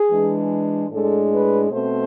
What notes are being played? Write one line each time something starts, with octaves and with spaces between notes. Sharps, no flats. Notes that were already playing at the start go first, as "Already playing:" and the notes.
Already playing: G#4
E3 G#3 D4
A2 G#3 D4 A4
B4
B2 A3 C4 C5